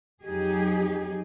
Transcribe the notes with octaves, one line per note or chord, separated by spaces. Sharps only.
F2 F#3 D#4 G4 G#4